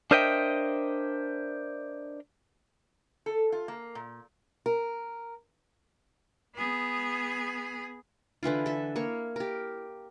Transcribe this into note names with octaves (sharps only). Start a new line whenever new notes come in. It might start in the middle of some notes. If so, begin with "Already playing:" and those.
D4 A#4 C5 D#5 E5 G5
A4
F4
A#3
A#2
A#4
B3 G#4
D3 E3 E4 F4
A4 E5
A#3 C#5
G4 A#4